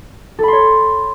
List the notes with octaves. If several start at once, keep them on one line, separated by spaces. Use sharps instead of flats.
A4 C#5 B5 C6